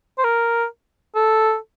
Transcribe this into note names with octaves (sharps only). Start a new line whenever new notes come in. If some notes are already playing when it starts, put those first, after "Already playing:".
C5
A#4
A4